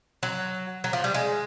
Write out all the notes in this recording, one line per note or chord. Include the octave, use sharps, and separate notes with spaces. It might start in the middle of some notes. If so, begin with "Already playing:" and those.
F#3
F#3
F3
G3
G#3